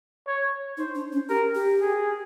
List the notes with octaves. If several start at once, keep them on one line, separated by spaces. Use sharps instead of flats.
C#5
D#4 C5
D4
C#4
G4 A#4
G4
G#4